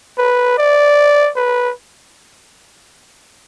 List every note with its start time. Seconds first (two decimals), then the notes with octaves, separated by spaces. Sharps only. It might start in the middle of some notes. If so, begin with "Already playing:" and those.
0.18 B4
0.58 D5
1.36 B4